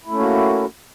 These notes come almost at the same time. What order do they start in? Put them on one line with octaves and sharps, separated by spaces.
E4 A3 C#4 A#3 F#4